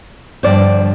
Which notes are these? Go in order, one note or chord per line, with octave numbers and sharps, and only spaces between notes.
G2 D3 F3 C5 D5